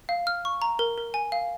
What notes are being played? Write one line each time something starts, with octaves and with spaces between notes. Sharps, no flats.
F5
F6
C#6
A#5
A#4
A#4
G#5
F5